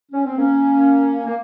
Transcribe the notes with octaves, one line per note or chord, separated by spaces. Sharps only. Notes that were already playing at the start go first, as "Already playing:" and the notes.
C#4
C4
A#3 C#4
A#3